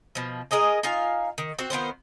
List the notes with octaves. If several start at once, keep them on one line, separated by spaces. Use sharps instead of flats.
B2 F3
G#4 A#4 D#5 G#5
D#4 F4 F5 G#5
D#3
C4 F#4
D#3 B3 F4 C5